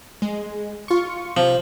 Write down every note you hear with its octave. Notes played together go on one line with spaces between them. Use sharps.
G#3
F4 C#6
C3 F3